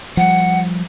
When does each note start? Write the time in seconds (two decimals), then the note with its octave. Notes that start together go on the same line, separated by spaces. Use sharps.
0.17 F3 G3 F#5